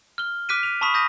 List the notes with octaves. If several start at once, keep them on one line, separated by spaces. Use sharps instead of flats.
F6 G7
D6 F6 F#6 B6 D7 D#7
D#7 F7
A5 B5 C#6 D#6 B6 F7
D#6 G6 A#6 D#7